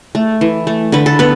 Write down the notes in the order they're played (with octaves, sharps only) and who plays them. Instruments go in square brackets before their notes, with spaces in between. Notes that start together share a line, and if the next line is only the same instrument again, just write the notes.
[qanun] A3
E3
A3
D3 B4
A4
B3 B4